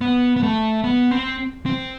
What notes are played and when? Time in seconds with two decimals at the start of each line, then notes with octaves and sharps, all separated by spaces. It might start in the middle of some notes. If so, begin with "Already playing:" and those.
0.01 B3
0.36 B3
0.43 A3
0.84 B3
1.11 C4
1.66 C4